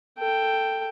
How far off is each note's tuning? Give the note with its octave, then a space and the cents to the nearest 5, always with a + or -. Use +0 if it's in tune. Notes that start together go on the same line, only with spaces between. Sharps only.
A4 +15 G5 +0